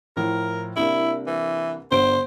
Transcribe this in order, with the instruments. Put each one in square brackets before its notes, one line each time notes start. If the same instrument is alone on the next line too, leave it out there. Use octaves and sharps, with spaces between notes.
[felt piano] A2 F3 [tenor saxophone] A#4
[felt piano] C2 A#3 D4 [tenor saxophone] E4
[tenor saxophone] E3
[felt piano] G1 D3 D7 [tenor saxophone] C5